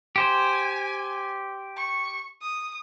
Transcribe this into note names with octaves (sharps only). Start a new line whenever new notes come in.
G4 C5 G#5
C#6
D#6